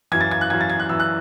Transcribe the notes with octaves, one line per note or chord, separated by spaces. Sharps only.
F#2 E3 G#6
A6
G#6
F#6
F#2 E3 G#6
A6
G#6
F#6
F#2 E3 E6
F#6